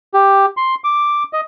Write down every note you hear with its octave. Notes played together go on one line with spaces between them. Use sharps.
G4
C6
D6
D#5